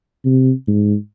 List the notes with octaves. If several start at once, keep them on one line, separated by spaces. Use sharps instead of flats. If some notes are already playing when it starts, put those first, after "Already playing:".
C3
G#2